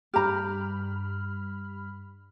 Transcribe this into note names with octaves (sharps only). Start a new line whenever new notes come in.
G2 G4 A#5 B5 F6